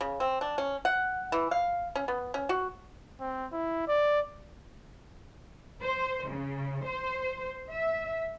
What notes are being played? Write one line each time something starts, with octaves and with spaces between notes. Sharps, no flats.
C#3
C4
D4
C#4
F#5
E3
F5
C#4
B3
C#4
F#4
C4
E4
D5
C5
C#3
C5
E5